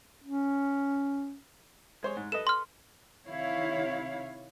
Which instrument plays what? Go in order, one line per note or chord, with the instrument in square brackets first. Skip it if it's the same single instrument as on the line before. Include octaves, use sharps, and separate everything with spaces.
[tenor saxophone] C#4
[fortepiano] G#3 C5 C#5
G#2
[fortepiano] A4 B4 D#5 [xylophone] E7
[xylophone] C6 F6
[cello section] C3 D#3 E4 C#5 F5